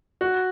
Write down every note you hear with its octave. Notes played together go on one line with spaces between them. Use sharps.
F#4